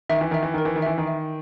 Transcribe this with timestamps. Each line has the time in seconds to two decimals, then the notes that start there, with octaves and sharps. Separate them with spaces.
0.09 D#3 E5
0.21 E3
0.31 D#3 E5
0.43 E3
0.54 D#3 A#4
0.65 E3
0.76 D#3
0.82 E3 E5
0.98 D#3
1.07 E5